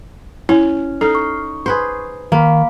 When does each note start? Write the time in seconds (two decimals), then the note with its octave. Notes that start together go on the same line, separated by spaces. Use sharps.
0.49 C#4 E4
1.01 D#4 A4 F6 C7
1.15 C#6
1.66 G#4 B4 C5
2.32 D#3 A#3 F5 B5